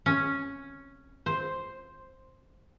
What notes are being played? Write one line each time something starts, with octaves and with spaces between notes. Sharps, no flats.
C#4
C5